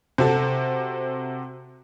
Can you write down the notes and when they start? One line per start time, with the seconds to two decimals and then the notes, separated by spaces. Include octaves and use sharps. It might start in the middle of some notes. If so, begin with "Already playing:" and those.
0.18 C3 F#4 A4